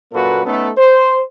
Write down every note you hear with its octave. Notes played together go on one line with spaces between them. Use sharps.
F#2 A#2 A#3 F#4 A4 B4
A3 B3 C#4 D#4 A4
C5